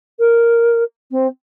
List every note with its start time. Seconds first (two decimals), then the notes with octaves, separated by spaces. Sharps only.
0.19 A#4
1.11 C4